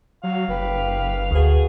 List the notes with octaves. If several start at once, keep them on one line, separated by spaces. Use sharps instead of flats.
F#3 F#4 F5
F#1 G4 B4
D2 A3 F#4 G#4 B4